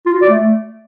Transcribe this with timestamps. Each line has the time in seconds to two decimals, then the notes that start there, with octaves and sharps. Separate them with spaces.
0.06 F4
0.14 F#4
0.21 D5
0.29 A3